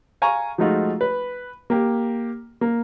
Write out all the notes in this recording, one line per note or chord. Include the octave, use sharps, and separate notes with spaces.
F5 G#5 A#5 C#6
F3 G#3 A3 D#4 F4 F#4
B4
A#3 G4
A#3